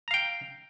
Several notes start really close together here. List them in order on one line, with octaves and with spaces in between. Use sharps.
A#5 F5 G5